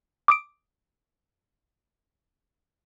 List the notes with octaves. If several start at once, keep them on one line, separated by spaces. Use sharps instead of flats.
D6 D#6 D7